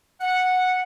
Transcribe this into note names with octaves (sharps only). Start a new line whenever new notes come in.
F#5